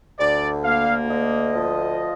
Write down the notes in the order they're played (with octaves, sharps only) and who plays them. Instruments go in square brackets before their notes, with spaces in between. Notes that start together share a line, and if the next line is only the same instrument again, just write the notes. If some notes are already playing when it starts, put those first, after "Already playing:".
[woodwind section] D2 [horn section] D5
[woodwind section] A#3 [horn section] F5
[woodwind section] D2 [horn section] D#5
[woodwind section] F3